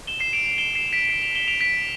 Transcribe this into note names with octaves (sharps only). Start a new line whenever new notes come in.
E7 G7
C7 E7
D7 F7
D7 F7
E7 G7
C7 E7
B6 D7
D7
C7
D7 F7
E7 G7
D7 F7
B6 D7